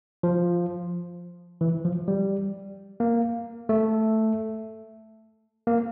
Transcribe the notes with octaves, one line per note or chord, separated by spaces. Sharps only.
F3
E3
F3
G3
A#3
A3
A#3